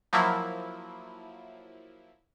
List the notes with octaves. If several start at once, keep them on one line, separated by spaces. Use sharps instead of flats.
F3 F#3 A#3 E4